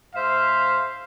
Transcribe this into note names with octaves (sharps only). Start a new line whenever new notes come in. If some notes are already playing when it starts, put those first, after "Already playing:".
G#2 C5 E5 F5